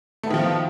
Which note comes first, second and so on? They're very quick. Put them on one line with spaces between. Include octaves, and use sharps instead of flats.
A3 B3 D#3 F3 F4